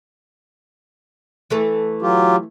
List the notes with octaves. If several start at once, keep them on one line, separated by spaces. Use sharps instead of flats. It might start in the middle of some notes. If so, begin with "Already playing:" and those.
E3 A3 A4
F#3 F4 G4